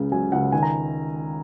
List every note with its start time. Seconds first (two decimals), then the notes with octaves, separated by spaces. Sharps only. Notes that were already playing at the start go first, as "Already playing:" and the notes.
Already playing: C#2 C#3
0.12 F#3 G#5
0.32 C#2 F#5
0.52 D#3 G#5
0.63 A#5